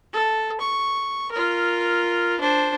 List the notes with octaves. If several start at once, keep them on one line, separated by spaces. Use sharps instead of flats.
A4
C#6
F4 A#4
D4 C5